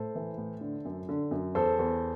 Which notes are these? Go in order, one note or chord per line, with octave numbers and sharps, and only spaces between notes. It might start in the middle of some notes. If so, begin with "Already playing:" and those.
Already playing: A2 A4 C5
E3
A2
D3
F#2
D3
F#2
E2 A4 C5
E2